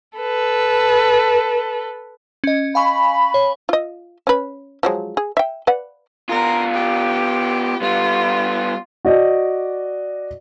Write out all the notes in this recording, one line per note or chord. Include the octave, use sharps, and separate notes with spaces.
A4 B4
C#4 D#5
F5 G#5 B5 C#6
C#5
F4 D#5
C#4 B4
F3 F#3 G#3
G#4
E5 G5
B4 D5 F#5
B3 F4 A#4
G4
G3 B3 F4
F#4 D5 D#5